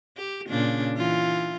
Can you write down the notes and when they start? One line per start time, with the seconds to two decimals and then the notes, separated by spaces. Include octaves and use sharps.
0.17 G4
0.49 A#2 C#3 D4
0.98 E3 F4